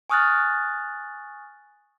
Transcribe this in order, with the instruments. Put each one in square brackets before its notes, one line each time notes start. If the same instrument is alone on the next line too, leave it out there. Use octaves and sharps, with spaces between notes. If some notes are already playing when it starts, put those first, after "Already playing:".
[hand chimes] G#5 C#6 D#6 F6 F#6 A6